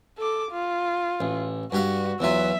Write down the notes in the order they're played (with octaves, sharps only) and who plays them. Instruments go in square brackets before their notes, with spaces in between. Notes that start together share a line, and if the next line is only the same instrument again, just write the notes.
[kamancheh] A4 D6
F4
[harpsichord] A1
[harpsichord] G2 G4 F5 [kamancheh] F#4
[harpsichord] E2 F#3 F4 [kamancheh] E5